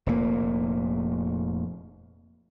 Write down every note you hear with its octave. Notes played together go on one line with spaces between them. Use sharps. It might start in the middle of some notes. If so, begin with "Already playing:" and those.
F1 A#2 A#3